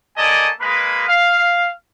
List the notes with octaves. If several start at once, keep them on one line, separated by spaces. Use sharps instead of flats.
A3 A#3 D5 D#5 G#5 A5
G#3 A#3 B4
F5